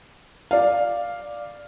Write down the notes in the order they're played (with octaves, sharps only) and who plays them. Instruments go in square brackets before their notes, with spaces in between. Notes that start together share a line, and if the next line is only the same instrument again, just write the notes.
[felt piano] D5 F5